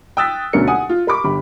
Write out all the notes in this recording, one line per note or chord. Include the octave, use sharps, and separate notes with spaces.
G5 D#6 E6 F#6 A6 B6
D2 B2 C#4 D4 A#4 C#7
F#5 G#5 D#6
F4
A#4 B5 C#6 D6
G1 G4 B5